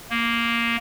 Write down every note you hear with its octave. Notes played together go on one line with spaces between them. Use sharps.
A#3